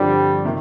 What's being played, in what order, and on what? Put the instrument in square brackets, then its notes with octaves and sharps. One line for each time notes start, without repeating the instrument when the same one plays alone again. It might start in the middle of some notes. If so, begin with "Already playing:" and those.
Already playing: [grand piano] G2 D3 F3 C4 [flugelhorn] G3
[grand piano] C3 D#3